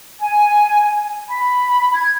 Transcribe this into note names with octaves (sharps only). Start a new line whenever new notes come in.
G#5
B5
G#6